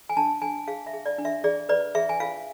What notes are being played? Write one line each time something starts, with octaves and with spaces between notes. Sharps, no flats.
G#5
D4 A5
D4 G#5
G#4 F5
E5
G#4
D5
D4
E5
G#4 D5
B4 D5
G#4 E5
G#5
F4 F5